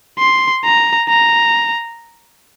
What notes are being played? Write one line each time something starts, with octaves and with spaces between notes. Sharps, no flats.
C6
A#5
A#5